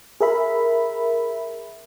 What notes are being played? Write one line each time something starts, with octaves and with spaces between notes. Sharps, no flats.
G#4 A#4 E5 B5